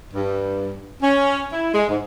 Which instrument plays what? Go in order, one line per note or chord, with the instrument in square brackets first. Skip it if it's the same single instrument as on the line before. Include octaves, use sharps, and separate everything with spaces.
[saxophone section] G2
C#4
E4
G#3
G#2